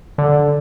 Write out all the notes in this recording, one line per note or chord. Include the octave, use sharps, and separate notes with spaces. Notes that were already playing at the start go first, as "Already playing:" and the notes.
D3